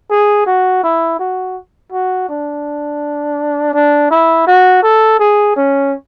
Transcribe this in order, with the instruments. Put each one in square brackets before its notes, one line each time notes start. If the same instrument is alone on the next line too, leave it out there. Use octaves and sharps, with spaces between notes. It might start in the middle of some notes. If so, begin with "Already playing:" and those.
[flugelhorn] G#4
F#4
E4
F#4
F#4
D4
D4
E4
F#4
A4
G#4
C#4